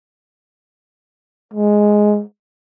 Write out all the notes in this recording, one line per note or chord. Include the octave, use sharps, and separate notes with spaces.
G#3